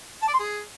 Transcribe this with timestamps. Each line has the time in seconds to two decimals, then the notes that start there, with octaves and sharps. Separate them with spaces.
0.22 A5
0.28 D5
0.34 C6
0.39 G#4